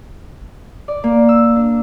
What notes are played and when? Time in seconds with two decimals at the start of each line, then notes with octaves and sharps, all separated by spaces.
0.88 D5
1.04 A#3
1.29 E6
1.56 D4